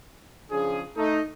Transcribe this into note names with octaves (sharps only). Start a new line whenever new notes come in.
C#3 F3 C#4 D4 G#4
A3 D#4